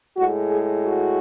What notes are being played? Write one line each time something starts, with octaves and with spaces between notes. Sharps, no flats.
A2 G#3 F#4
G#4
F#4